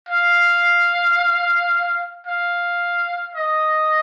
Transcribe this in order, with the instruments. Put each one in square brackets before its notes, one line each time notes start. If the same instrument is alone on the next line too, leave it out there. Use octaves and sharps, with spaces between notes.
[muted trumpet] F5
F5
D#5